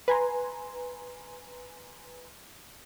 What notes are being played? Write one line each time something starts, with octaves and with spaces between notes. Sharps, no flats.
B4 G#5 A#5 C6